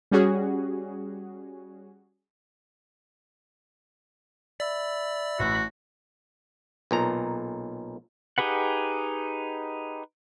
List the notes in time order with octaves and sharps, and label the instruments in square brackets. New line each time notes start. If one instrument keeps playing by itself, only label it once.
[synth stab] G3 C#4 F#4 G#4
[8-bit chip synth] D5 [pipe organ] E5 B5 E6
[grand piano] A1 [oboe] F#4
[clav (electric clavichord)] B1 A#2 A#5
[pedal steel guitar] D#4 G4 G#4 B4 F#5